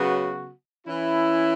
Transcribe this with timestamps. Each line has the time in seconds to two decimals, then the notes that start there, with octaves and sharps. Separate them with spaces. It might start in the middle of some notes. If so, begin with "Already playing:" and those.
Already playing: C#3 F#3 B3 F#4
0.85 E3 C#4 E4